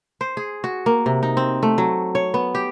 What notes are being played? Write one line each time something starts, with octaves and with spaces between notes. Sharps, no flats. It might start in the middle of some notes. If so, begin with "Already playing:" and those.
C5
G#4
F#4
A#3
C3
D#4
C4
A3
F#3
C#5
B3
G4